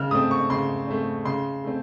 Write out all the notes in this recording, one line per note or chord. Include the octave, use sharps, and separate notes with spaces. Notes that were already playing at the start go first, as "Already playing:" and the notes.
Already playing: C#3 F6
A3 C4 D#6
C#6
C#3 C6
A3 C4
C#3 C6
A3 C4